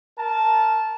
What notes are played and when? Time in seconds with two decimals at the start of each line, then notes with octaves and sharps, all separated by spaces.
0.17 A#4 A5